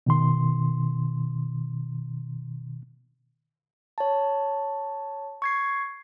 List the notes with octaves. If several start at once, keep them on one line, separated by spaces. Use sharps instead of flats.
B2 D#3 C6
C#5 A5
C#6 G#6 C7